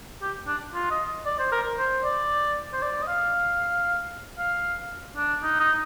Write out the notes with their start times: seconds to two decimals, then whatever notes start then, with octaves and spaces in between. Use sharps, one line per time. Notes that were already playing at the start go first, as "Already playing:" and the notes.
0.22 G4
0.47 D4
0.74 F4
0.91 D#5
1.26 D5
1.39 C5
1.52 A#4
1.78 C5
2.05 D5
2.73 C5
2.83 D5
3.03 D#5
3.08 F5
4.39 F5
5.17 D4
5.43 D#4
5.60 D#4